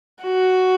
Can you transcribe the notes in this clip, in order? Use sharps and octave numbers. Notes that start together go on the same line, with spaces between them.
F#4